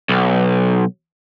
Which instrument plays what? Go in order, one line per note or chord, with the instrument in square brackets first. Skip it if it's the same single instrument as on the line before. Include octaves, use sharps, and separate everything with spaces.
[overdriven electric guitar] B1